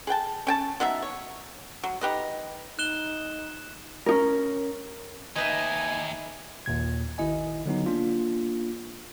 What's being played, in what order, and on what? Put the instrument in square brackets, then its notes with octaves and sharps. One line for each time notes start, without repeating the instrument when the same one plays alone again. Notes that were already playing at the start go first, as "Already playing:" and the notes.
[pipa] G#4 B4 G5 A5
C#4 G5 A5
F#3 B3 D#4 E5
C#5
F#3
D#4 G4 B4 D#5
[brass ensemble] D#4 [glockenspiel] F#6 E7 G7
[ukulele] C#4 D#4 A#4
[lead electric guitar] D#2 D#5 [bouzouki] D#4 B4 E5 [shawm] G#5
[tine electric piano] G#1 D#2 A#2 G#6
G#1 D#3 E4 D#5 G#5
D3 F#3 B3 D#4
A#3 D4 F4